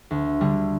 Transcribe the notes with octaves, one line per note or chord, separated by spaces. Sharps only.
D2
D3 G3